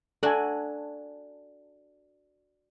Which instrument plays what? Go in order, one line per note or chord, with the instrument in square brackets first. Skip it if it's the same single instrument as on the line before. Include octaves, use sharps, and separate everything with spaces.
[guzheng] D4 F#4 [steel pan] A4 G#5